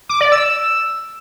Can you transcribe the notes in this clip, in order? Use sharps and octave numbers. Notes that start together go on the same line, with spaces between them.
D6
D5
E6